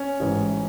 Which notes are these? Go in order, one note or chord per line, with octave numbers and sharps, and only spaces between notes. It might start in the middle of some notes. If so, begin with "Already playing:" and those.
Already playing: C#4
A1 G#2 E3